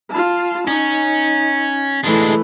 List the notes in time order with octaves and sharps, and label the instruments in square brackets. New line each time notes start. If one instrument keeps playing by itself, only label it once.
[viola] F4 A5
[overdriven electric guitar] C#4 [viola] D#4
[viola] E3 A3 [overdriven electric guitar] G#3 D4